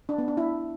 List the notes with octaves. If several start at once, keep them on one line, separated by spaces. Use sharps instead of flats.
D4
B3
D4
E4